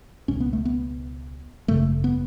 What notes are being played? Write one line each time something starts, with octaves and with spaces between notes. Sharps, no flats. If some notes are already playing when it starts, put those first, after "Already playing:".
C#2 B2 C#4
B3
A3
B3
G#1 F#2 C#3 A3
B3